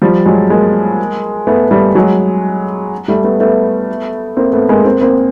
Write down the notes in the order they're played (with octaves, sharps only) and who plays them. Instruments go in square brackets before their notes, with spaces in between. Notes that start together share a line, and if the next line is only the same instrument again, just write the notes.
[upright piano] F3 G3
F#3 G#3
G#3 A#3
A3 B3
G3 A3
F#3 G#3
G3 A3
A3 B3
A3 B3
A#3 C4
A3 B3
G#3 A#3
A#3 C4
A#3 C4